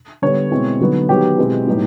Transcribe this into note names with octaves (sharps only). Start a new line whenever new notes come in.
D3 G3 B3 D4 C#5
B2 G#3 C4 E4
D3 F#3 B3 D#4
D#3 F#3 B3 D#4 G4
B2 G#3 C4 E4
A2 F#3 B3 D#4